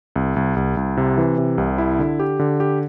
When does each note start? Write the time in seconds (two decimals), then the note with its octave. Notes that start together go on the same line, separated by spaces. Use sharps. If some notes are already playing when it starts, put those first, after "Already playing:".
0.16 C2
0.36 C2
0.56 C2
0.77 C2
0.97 C3
1.18 E3
1.38 C3
1.58 C2
1.78 E4
1.99 D3
2.19 G4
2.39 D3
2.60 G4